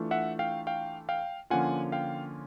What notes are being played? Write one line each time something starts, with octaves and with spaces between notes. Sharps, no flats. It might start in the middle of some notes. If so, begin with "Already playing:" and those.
Already playing: E3 A3 D4 F4
E5 F#5
F5 G5
F5 G5
F5 G5
D3 F3 A#3 C#4 F4 F#5 G#5
F5 G5